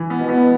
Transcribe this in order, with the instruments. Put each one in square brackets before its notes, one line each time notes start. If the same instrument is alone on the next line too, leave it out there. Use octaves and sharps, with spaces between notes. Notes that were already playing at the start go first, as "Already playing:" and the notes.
Already playing: [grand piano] E3
B3
[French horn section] B2
[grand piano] B3